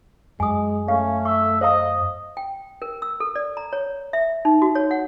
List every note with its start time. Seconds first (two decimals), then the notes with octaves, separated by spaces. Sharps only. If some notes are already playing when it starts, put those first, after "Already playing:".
0.40 F#2 G#3 G#5 D#6
0.88 A3 C#4 F5
1.25 E5 C#6
1.61 C5 D#5 F5 A#5
2.37 G5
2.82 A#4
3.02 E6
3.20 A4
3.36 D5
3.57 A#5
3.73 C#5
4.13 E5
4.45 D#4
4.62 F#4
4.75 C#5
4.91 F#5